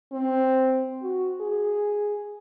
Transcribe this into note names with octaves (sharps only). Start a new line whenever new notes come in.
C4
F#4
G#4